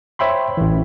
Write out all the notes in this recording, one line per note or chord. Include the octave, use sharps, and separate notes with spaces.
C5 C#5 E5 G5 B5 C6
A1 E3